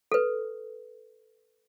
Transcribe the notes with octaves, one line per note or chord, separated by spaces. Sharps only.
A4 B4